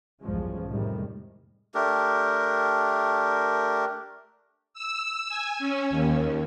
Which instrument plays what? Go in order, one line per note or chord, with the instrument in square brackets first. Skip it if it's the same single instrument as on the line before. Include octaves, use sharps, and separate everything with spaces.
[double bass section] B1 E2 G2 F3 G#3 C#4
F2 A2 C3 D#3 G3 G#3
[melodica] A3 D4 G4 A#4
[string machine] E6
G#5
C#4
D#2